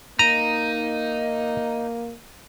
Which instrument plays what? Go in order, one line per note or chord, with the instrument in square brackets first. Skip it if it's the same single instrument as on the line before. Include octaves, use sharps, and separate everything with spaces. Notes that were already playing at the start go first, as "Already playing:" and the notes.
[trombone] A#3 [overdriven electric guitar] D#4 [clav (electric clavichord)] A#5 [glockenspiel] D#7